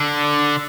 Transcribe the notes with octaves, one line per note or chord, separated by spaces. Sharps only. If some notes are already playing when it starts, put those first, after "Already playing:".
Already playing: D3